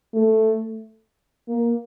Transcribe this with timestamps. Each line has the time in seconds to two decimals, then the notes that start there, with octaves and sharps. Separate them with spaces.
0.14 A3
1.48 A#3